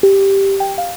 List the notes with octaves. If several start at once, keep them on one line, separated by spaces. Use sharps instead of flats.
G4
G5
F5